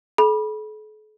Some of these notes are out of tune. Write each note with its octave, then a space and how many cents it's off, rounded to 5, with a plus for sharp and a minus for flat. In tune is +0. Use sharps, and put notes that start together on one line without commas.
A4 -45 B5 -25